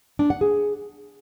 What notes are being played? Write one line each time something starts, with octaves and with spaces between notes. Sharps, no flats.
D4
F#5
G#4